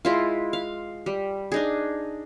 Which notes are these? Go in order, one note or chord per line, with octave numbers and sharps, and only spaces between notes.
G#3 E4 F4
F5
G3
D4 D#4 G#4